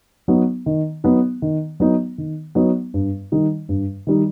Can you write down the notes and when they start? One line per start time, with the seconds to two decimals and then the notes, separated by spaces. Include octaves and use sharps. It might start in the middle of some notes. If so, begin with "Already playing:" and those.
0.28 F#3 B3 D#4
0.66 D#3
1.04 F#3 B3 D#4
1.42 D#3
1.80 F#3 B3 D#4
2.18 D#3
2.55 F#3 B3 D#4
2.94 G2
3.32 D#3 G3 D#4
3.69 G2
4.07 D#3 G3 D#4